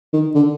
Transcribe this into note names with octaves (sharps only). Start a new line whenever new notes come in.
D#3
D3